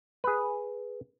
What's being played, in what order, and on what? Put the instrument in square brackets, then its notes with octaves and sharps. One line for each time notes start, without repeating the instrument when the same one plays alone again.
[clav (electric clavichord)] G#4 B4